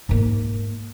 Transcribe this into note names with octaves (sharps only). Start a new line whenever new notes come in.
G#2 A#3